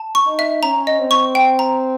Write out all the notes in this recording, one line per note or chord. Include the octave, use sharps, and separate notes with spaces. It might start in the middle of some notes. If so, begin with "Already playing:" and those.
Already playing: A5
C#6
D#4
E5
C#4 A#5
D#5
C4
C#6
G5
A#5